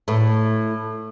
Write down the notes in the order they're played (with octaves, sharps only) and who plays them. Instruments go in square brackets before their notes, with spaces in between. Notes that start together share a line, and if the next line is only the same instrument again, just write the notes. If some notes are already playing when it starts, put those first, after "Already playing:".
[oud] A2